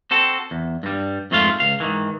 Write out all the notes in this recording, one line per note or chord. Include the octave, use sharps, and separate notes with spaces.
C4 F#4 A4
E2
G2 G3
F2 G#2 A3 F4 F5
C#2 F5
G#2 D#3 E3